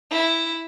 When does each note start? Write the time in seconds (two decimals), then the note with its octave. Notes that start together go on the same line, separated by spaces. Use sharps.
0.11 E4